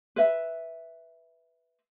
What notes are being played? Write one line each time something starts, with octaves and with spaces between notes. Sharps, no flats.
B4 E5